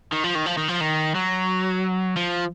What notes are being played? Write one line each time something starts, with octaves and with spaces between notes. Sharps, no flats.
D#3
F3
D#3
F3
D#3
F3
D#3
F#3
F3